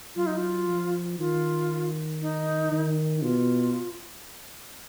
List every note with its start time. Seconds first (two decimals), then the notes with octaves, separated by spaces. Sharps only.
0.16 F#3 F4
0.26 D#4
0.37 F4
0.67 F3
1.18 D#3 F4
2.21 D#4
2.72 D#3
3.17 D#4
3.22 B2 F4